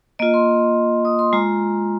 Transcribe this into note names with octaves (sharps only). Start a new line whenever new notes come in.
A#3 F4 D#5
C6
D#6
C6
G#3 F4 A#5